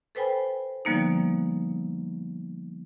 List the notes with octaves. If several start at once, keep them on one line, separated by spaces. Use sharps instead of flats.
A4 B4 C5 G5 G#5 B5
D3 F3 G3 A#3 B3 D#4